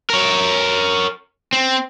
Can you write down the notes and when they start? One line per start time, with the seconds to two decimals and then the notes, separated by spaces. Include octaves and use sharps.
0.10 A#4 C#5
1.53 C4